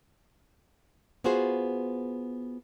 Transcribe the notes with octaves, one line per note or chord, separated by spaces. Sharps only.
B3 F4 F#4 G#4 C5